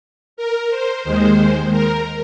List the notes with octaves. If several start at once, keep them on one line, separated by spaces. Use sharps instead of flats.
A#4
C5
D#2 D#3 G#3 C5
A#4